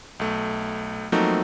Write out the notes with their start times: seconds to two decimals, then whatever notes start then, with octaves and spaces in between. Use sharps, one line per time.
0.20 B1 A3
1.12 F3 F#3 A3 A#3 C4 D#4